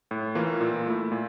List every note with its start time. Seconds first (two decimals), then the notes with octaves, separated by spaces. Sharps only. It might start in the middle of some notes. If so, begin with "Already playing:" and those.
0.11 A2
0.35 E3 A#3 F4
0.61 A#2
0.87 A3 E4
1.12 A#2